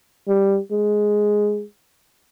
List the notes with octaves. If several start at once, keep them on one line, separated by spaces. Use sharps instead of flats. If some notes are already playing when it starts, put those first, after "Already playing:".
G3
G#3